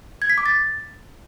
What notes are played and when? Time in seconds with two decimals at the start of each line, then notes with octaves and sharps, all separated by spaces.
0.22 G#6
0.30 B6
0.38 D6
0.46 A6